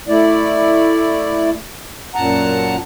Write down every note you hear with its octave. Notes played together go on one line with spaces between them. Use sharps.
A3 E4 D5
F#2 A#2 F#5 A5 A#5